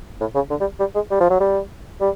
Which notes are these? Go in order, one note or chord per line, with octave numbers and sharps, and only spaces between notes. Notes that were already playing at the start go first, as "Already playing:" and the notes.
A2
C#3
D3
G3
G3
G#3
G3
F3
F#3
G3
G3